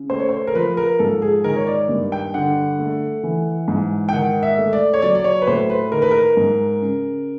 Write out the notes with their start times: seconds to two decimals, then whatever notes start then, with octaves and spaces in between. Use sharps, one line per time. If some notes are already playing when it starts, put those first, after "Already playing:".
Already playing: C#3
0.10 A3 C5
0.19 C#5
0.29 C5
0.47 A#4
0.55 F3 B4
0.77 A#4
0.99 G#2 A4
1.22 G#4
1.44 D#3 A#4
1.56 C#5
1.67 D5
1.89 G2
2.12 G5
2.34 D3 F#5
2.79 A3
3.23 E3
3.68 G#2
4.09 G5
4.13 D#3 F#5
4.43 E5
4.58 A3
4.73 D5
4.94 C#5
5.02 F#3 D5
5.15 D5
5.24 C#5
5.42 B4
5.47 A2 C5
5.70 B4
5.92 D#3 A#4
6.02 B4
6.11 A#4
6.37 G#2
6.82 C#3